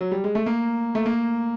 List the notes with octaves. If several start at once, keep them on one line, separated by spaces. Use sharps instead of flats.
F#3
G3
G#3
A3
A#3
A3
A#3